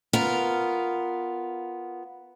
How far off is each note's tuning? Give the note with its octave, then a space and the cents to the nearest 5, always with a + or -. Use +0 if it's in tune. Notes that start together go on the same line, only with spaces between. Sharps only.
B3 +0 F4 +0 A#4 -5